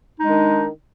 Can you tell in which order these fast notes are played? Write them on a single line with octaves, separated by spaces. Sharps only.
D#4 G#3 D4 D#3